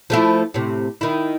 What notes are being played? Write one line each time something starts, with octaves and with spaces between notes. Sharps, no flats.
F3 A3 E4
A2 C3
D#3 E4